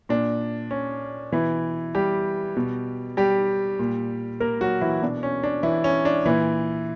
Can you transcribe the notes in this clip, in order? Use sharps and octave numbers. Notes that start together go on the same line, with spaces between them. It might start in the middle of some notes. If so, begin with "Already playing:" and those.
A#2 D4
C#4
B2 E3 E4
G3 G4
B2
G3 G4
A#2
A#3 A#4
F#3 F#4
E3 E4
B2 D4
C#4
D4
E3 E4
C#4
D4
A#2 E3 E4